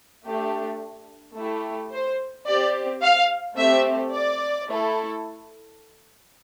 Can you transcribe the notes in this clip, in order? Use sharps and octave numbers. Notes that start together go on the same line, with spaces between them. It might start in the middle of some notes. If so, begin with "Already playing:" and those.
A3 D4 G4
A3 E4 G4
C5
C4 G4 D5
F5
A3 C4 G4 E5
D5
A3 E4 A4